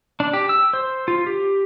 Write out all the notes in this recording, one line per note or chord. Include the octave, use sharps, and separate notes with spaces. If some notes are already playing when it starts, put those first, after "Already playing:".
D4
G4
E6
C5
F4
G4